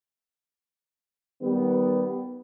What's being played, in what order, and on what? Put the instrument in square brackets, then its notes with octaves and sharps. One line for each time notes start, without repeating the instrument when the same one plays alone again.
[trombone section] D#3 G3 B3